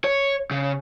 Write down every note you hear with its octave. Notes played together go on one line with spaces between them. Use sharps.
C#5
C#3